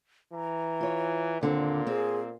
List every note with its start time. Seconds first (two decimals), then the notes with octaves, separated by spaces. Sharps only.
0.33 E3 A#5
0.81 F4 C#5
1.41 D#2 A#2 D3 C4
1.87 C4 G#4